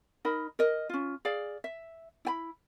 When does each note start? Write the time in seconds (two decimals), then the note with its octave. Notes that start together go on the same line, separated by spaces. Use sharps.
0.25 D#4 A#4 D#5 B5
0.59 A#4 D#5
0.89 C#4 F4
1.25 G#4 D5 F5
1.64 E5
2.25 E4 G5 B5